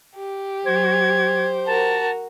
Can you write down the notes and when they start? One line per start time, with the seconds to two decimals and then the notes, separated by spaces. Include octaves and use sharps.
0.16 G4
0.66 F#3 C5 G#6
1.66 F#4 A#4 A5